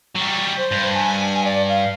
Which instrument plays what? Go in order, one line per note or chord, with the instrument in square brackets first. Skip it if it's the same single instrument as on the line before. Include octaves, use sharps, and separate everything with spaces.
[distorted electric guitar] F#3 G3
[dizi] C5
[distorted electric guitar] G2
[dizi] G#5
D5
F5